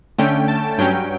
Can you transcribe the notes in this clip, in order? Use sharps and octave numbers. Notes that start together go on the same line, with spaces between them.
D3 A3 C#4 G5
A5
G2 F#3 C#4 G5